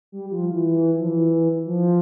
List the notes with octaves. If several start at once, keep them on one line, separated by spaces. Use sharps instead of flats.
G3
F3
E3
F3
E3
F3